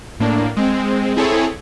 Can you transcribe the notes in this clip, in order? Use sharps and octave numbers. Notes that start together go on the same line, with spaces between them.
A2 A#3 D4
G#3 C4
C4 E4 G#4 A4 C#5